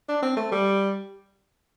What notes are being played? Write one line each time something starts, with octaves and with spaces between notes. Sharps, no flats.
D4
C4
A3
G3